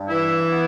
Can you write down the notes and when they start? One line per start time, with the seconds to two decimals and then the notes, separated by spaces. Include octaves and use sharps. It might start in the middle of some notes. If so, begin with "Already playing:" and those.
Already playing: G2
0.08 E3 E4
0.52 B3